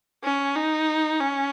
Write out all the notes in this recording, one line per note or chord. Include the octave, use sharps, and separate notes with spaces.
C#4
D#4
C#4